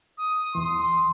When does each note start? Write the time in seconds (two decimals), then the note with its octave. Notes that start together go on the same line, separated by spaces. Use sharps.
0.18 D#6
0.55 E2 E3 C6